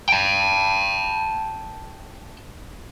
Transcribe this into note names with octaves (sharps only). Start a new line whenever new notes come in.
G5 A5